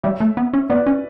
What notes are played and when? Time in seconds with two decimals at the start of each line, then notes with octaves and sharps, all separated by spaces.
0.03 G3 C#5 E5
0.20 A3
0.37 B3
0.53 C#4
0.69 B3 B4 D5
0.86 C#4